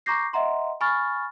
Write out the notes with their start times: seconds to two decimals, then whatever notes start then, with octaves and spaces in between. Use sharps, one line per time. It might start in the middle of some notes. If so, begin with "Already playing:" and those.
0.06 A#5 C#6 D6 G6 A#6 C7
0.33 D#5 E5 F#5 A#5 C6
0.81 G#5 B5 C#6 F6 A6